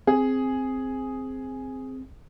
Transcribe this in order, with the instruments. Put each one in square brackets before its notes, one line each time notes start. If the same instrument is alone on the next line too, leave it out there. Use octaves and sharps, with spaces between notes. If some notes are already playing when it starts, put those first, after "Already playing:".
[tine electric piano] C4 [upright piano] G#4